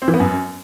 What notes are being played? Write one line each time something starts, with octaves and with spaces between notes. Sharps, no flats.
C4
E3
B3
F#2